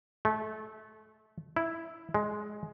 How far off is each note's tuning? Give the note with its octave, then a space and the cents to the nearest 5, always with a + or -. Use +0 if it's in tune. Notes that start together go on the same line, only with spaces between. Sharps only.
A3 -25
E4 +0
G#3 +10